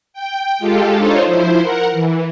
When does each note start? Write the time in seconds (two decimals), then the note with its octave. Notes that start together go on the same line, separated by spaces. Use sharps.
0.13 G5
0.59 G#3 F4 G4 A4
0.96 D4 D#4 F4 A4 C5 C#5
1.25 F3 E4 C5
1.62 A#4 F#5
1.92 E3